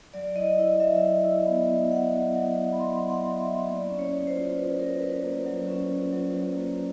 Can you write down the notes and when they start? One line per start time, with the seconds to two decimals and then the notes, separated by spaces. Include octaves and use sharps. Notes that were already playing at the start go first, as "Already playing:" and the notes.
0.14 F#3 D5
0.36 E4 D#5
0.59 E4 D#5
0.80 F#3 E5
1.03 E4
1.25 E4
1.46 B3
1.70 F#3
1.91 E4 F#5
2.14 F#3
2.35 F#3 F#5
2.58 E4
2.72 B5
2.79 F#3 C6
3.02 B3
3.10 F#5
3.24 F#3
3.39 E5
3.46 E4
3.69 A#3 D5
3.90 C#4
3.99 C#5
4.13 C#4
4.27 C5
4.36 F4
4.57 C#4 B4
4.79 F4 A#4
5.01 C#4 B4
5.24 A#3
5.46 F#3
5.68 C#4
5.91 F4
6.12 F#3
6.35 F#3
6.57 A#3